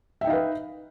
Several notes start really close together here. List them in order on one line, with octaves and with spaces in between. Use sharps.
E5 G5 D#4 F5 B4